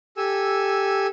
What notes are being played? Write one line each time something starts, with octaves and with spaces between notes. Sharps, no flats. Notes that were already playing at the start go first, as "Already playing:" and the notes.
G4 A4 G#5 E6